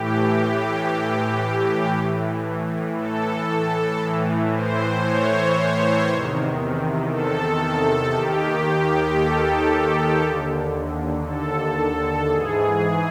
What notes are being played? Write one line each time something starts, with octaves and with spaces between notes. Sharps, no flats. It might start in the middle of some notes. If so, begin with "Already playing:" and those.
Already playing: A2 E3 G4
A2 E3
A4
A2 E3
C5
C#5
C5
E2 C3 D#3
A4
D#2 D#3 G4
A4
D#2 D3
A4
G#2 E3 G#4